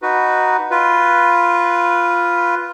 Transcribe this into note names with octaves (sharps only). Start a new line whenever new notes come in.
D#4 F#4 B4
F4 B4